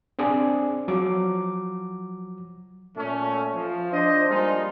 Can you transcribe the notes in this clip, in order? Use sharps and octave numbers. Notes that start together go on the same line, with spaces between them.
C4 D4 G#4 D5
F3 F#3 D6
A#2 A3 C#4
F3
D4 C5 D#5
F3 G3 G#3 A#3 D#4 F4